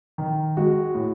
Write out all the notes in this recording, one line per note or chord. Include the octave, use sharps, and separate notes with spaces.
D#3
G#3 F#4
A2